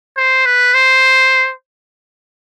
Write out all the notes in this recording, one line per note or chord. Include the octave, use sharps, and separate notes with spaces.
C5
B4
C5